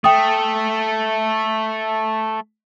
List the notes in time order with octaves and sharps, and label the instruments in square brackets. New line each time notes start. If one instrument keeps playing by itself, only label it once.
[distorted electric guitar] A3 [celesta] G5 D#6